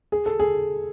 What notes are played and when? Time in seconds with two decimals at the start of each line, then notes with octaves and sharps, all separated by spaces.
0.12 G#4
0.26 A4
0.39 G#4